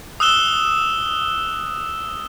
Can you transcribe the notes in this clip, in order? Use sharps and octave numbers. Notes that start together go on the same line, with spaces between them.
D#6 E6 F#6 E7 G7